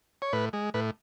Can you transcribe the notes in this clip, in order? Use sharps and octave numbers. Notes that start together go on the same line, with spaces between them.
C#5
A2 B4
G#3
A2 B4